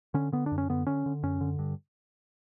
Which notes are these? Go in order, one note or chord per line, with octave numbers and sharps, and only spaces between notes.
D3 C#4
D3 B3
D4
F#2
C#4
D3 B3
D3 C#4
D3
F#2 C#4
D3
G2